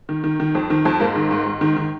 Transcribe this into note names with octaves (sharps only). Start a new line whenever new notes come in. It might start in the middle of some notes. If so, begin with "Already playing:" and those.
D#3
D#3
D#3
F2
D#3
F2
G#2 A#3
D#3
G#2
G#2
D#3
D#3